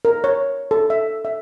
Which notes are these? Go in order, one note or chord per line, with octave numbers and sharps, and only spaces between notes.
A#4
C#5
A4
E5
E5